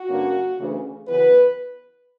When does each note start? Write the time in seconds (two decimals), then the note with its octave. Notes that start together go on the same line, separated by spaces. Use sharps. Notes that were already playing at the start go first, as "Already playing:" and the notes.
Already playing: F#4
0.08 G2 D3 A#3 C#4
0.58 D2 C#3 E3
1.07 F#2 C#3 E3 B3 B4